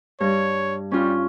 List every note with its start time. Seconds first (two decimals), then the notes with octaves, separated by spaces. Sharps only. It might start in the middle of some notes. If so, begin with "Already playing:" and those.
0.20 G2 C#5
0.91 G3 C#4 F4